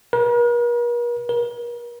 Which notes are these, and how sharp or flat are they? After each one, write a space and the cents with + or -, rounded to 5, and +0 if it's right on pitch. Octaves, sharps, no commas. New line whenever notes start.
A#4 +45
A#4 +40